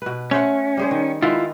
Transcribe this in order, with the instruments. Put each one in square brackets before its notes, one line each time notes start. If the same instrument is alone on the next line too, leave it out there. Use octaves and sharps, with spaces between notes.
[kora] B2 B4
[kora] A3 C5 F#5 [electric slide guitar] C#4
[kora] G3 G#4 C5
D#3
[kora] D#3 G#3 B3 [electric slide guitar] E4 F4